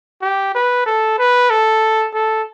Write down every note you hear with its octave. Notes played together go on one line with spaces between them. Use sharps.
G4
B4
A4
B4
A4
A4